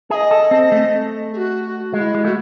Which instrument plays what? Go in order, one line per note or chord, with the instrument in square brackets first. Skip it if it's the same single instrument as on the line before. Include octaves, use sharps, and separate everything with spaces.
[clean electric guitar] G#4 [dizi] E5
[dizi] D#5
[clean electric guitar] A4
C4
A3
[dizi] G#4
F#4
[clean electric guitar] G#3 [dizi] F#4
[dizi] E4
[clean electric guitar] G#3
[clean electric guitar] A3 [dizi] F#4